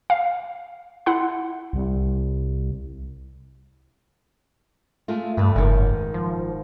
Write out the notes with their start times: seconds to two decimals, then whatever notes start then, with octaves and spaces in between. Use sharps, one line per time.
0.10 F5
1.06 E4 F#5 C6
1.73 C2
5.08 G#3 A3 F4
5.37 G2 A3 B4
5.56 F#1 G#2 D#3
6.14 F3